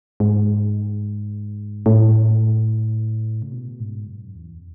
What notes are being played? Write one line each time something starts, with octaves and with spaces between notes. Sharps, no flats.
G#2
A2
C#3
B2
G#2
F#2
E2